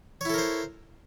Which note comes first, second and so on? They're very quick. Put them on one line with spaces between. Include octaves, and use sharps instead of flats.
C#5 E4 A4 A#4 C5